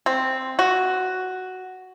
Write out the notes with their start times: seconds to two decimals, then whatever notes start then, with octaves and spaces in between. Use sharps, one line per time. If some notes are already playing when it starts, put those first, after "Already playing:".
0.06 C4
0.59 F#4